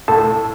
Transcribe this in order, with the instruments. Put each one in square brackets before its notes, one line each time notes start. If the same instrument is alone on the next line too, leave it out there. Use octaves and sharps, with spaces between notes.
[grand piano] A2 [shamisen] A4